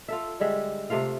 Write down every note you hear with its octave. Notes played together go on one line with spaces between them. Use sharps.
F4 A4 E5
D3 G3 G#3 E5
C3 A3 F4 F5